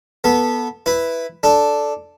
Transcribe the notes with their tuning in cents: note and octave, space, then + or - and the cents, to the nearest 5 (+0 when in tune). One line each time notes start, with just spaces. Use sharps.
B3 -15 A4 +0
E4 +0 B4 +0
D4 +0 A4 +0